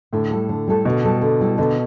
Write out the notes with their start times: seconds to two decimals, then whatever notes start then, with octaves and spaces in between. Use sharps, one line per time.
0.13 A2 D3
0.31 G3 E4 A4
0.49 D3
0.68 G3 E4 A4
0.85 B2 D3
1.04 G3 E4 A4
1.22 D3
1.41 G3 E4 A4
1.58 B2 D3